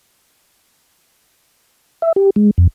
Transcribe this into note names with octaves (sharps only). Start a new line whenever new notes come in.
E5
G4
G#3
F2